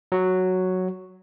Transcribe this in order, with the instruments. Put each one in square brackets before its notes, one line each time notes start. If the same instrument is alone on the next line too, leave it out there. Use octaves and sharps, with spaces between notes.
[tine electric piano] F#3 F#4